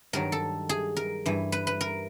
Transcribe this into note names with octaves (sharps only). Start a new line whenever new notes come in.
G2 D#3 F#3 A#4
A4
G#4
A#4
G2 E3
B4
B4
A#4